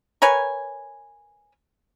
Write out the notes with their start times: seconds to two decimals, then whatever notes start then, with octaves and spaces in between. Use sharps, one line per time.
0.22 A#4 B4 C#5 G#5